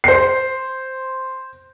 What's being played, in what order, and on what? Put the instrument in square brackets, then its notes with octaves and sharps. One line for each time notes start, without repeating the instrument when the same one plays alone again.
[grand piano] C5 C7